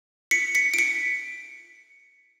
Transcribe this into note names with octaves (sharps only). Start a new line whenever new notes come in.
B6 C#7
B6 C#7
D7
B6 C#7